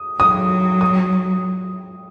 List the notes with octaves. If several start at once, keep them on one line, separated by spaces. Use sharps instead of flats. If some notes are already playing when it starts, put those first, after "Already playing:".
Already playing: D#6
F#3 D#6
D#6